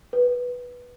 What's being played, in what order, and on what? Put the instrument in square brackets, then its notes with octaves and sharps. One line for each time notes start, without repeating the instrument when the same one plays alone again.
[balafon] B4